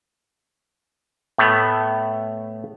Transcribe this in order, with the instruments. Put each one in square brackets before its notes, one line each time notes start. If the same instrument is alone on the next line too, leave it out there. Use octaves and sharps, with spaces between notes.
[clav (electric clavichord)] A2 A3 B3